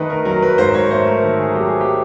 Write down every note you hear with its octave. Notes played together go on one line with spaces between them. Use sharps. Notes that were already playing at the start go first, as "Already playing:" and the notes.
Already playing: D#3 A3 B4 D#5
A#4
F#3 A#4
B4
G#2 C5
C#5
A3 C5
A#4
D#3 A4
G#4
F#3 G4
G#4
G4